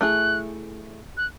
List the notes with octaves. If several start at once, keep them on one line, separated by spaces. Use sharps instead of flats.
A3 E4 G#4 F#6
F#6